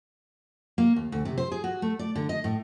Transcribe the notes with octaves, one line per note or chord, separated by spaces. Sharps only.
A#3
D#2
D2
C3
C5
G#4
F#4
A3
D5
D3
D#5
A2